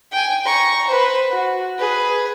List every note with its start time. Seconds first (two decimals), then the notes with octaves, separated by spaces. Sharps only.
0.12 G5 G#5
0.46 A#5 C#6
0.87 B4 C5
1.31 F#4
1.78 G#4 B4